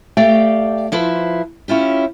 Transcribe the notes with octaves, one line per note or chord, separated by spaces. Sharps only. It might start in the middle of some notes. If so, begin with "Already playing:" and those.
A3 G4 D5 F5 G5
F3 E4 B4 C5
C#4 E4 F4 G4